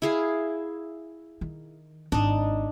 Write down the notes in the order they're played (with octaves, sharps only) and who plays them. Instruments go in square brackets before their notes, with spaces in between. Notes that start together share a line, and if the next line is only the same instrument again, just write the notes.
[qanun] E4 G#4 F5
[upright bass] D#3
[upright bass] G#1 [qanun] D4 D#4